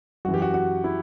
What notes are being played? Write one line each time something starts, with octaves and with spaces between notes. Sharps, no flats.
F#2 E3 F#4
G4
F#4
F#4
E4